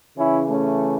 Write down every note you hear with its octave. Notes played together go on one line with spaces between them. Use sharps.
C#3 E3 C#4 E4
A3 C#4